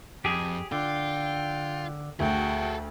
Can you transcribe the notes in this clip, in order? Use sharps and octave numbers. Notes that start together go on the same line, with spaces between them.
F2 G4 G#4
D3 F4 G5
D2 F#4 G#4 A4 G5